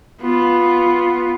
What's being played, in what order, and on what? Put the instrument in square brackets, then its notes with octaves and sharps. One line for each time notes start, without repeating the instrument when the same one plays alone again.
[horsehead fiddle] B3 F4